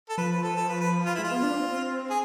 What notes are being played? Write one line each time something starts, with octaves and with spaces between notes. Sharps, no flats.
A4
F3 B4
B4
A4
A4
B4
B4
F4
G#3 E4
F4
B3
D4
C4
C4
G#4